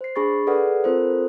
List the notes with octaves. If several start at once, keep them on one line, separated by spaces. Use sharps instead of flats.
C5 C7
D4 G#4 B5 C#6 A6
G#4 A4 B4 D5 F#5
C4 F4 A4 A#4 C5